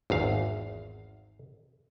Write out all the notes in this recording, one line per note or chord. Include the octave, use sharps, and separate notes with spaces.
G#1 E2 F5